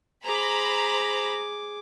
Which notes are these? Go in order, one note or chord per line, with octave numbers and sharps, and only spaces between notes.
G#4 C5 A#5 B5 D6